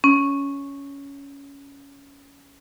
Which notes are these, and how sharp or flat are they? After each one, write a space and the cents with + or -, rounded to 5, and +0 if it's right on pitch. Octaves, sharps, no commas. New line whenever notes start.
C#4 +15